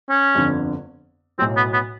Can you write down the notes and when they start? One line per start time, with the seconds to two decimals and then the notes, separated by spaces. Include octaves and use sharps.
0.10 C#4
0.35 G1 F2 D3
1.39 B1 A2 F#3 C4
1.57 B3
1.73 B3